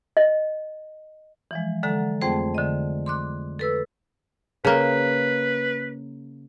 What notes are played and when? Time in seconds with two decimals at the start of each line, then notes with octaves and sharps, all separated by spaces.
0.17 D#5
1.51 E3 F3 G#3
1.83 D3 F#3 G#3 A4 F#5 A#5
2.21 F2 A3 C4 G#4 C5 G5
2.55 D3 D#5
3.06 C6 D6 F#6
3.59 A4 B4 E6
4.65 C#3 A#3 B4